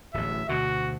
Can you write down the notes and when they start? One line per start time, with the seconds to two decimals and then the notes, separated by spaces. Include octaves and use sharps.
0.14 D1 A1 E5
0.49 D2 B2 D3 F#4